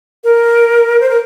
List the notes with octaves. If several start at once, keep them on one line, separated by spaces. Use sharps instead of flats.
A#4
C5
A#4